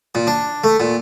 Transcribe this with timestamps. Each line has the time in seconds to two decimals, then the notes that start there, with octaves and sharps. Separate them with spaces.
0.15 A#2
0.27 D4
0.64 A3
0.80 A#2